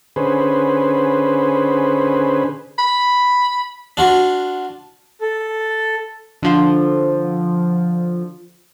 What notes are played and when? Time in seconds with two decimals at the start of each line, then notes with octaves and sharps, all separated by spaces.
0.16 D3 C#4 G#4 B4 C5
2.79 B5
3.97 D4 F4 F#4
5.21 A4
6.43 D3 F3 F4